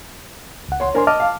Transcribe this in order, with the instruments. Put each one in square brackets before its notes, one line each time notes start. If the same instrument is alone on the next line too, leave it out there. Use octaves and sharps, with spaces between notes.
[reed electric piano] C#2 F#5
[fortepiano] C#5 C6
[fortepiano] D4 A#4 [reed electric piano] C5 G#5 C6
[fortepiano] D#5 [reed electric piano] A5 D6 F6
[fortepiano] F5